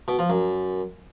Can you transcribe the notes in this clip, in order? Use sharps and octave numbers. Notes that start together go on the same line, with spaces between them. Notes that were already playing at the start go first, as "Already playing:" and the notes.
B2
F3
F#2